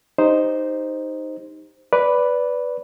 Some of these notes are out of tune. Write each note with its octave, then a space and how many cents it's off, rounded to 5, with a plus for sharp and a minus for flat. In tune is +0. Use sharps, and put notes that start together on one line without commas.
D#4 +0 G4 +15 C5 +0
B4 +0 D5 -15